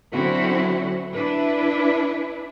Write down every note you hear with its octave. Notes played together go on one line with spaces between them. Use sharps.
D3 F#3 C4 C#4 E4 F#4
D4 E4 B4